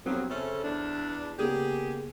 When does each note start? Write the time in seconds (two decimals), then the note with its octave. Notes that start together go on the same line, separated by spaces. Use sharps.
0.06 G2 F3 F#3 B3 C4
0.30 C#3 C#4 A4 C5 E5
0.63 E2 D4
1.38 C#3 A#3 B3 G4 G#4